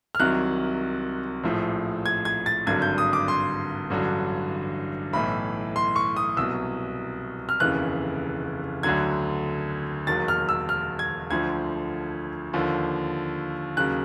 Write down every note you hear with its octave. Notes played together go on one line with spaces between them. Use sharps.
F6
C2 C3 D#3 F#3 F#6
A#1 A2 F3
G#6
G#6
A6
G#1 G2 D3 F#3 G#6
G6
D#6
D6
C6
A1 G2 D3 F#3
B1 A2 E3 B5
C6
C#6
D#6
C2 B2 F#3 E6
F6
F1 D#2 C#3 E3 F#6
D2 D3 F#3 G#6
E1 D#2 D#3 F#3 A6
F6
E6
F6
G#6
D2 D3 F3 G#6
D#2 D3 F3
D#2 C#3 F#3 F#6